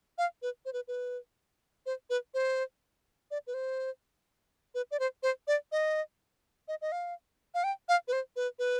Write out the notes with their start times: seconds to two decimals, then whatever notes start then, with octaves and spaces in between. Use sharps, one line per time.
0.18 F5
0.42 B4
0.65 C5
0.73 B4
0.88 B4
1.86 C5
2.10 B4
2.34 C5
3.31 D5
3.47 B4
3.54 C5
4.75 B4
4.91 D5
4.99 C5
5.23 C5
5.47 D5
5.72 D#5
6.68 D#5
6.82 D#5
6.92 F5
7.54 F5
7.64 G5
7.89 F5
8.08 B4
8.13 C5
8.36 B4
8.59 B4